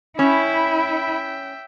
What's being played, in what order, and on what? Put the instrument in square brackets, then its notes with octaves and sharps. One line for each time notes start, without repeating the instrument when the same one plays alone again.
[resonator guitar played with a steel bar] C#4 [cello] E4 [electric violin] E5 G5 [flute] B5